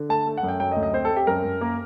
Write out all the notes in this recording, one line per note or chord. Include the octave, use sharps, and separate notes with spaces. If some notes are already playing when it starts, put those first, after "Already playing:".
Already playing: D3
A3 A5
A3
F#5
F#2
G5
F#3 G5
D#5
D2
D#5
C4 C5
A4
C4
G4
F#2 A#4
F#2
A#3